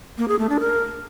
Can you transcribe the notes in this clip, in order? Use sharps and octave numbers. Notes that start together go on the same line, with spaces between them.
A#3
G#4
A3
D4
A#4